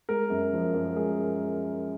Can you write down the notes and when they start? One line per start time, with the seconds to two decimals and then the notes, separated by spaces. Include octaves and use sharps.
0.09 G#3 A#4
0.30 F#2
0.53 F3
0.74 F#2
0.96 G#3 G#4